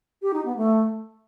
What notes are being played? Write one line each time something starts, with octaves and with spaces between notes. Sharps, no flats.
G4
D#4
B3
A3